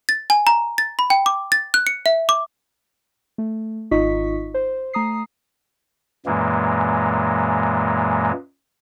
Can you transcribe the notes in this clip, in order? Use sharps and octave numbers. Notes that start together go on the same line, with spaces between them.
A6
G#5
A#5
A6
B5
G5
D6
A6
F#6
C#7
E5
D6
A3
G#1 D#4 F4 D#5 C#6 B6
C5
A3 A#5 D#6 C7
F#2 A#2 E3 G#3 A#3